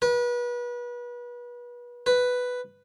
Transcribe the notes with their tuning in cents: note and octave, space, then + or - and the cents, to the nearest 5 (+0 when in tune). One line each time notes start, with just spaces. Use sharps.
B4 -30
B4 +5